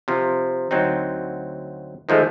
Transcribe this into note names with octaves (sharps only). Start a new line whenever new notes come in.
C3 F3
D2 F#3 C4 D#4
D#3 F3 G#3 A3